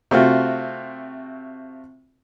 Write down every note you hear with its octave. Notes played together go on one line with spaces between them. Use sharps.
C3 A3 C4 F4 F#4